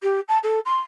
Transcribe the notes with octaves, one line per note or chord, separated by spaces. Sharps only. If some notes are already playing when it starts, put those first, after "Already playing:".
G4
A5
A4
C6